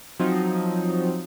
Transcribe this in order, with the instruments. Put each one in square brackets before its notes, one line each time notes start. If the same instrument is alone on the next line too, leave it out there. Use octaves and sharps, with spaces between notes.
[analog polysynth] F3 F#3 C4 D#4